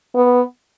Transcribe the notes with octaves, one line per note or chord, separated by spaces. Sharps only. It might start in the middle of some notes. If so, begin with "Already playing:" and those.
B3